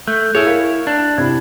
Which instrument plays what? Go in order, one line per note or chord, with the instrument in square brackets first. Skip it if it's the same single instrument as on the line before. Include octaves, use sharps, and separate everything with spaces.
[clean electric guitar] A3 [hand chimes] F#6 G6
[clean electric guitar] E4 C#5 [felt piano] G#4
[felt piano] A#4 [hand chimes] F5
[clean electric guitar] D4
[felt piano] C3 E4 [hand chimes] G#6